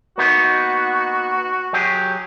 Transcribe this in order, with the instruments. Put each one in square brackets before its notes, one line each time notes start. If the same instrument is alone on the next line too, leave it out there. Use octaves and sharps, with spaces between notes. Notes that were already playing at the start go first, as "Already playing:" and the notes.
[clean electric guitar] A#3 B3 D#4 [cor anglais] F#4
[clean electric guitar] F#3 G4 G#4